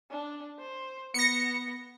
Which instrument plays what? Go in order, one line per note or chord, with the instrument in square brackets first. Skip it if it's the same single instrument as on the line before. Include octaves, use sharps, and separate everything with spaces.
[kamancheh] D4
C5
[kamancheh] B3 [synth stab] A#6 C#7